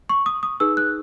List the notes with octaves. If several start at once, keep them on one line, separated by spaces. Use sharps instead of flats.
C#6
D#6
D#6
D#4 G#4 B4 E6
F#6